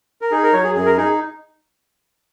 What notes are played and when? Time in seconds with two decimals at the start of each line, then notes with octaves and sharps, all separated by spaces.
0.22 A#4
0.31 D#4 G#4
0.43 A#4
0.53 F#3 C#5
0.64 G#4
0.75 F#2 G#4
0.86 A#4
0.97 D#4 G#4